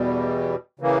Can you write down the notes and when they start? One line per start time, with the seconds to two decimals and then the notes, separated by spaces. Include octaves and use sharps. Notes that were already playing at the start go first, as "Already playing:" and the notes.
Already playing: E2 B2 G3
0.79 C#3 E3 A#3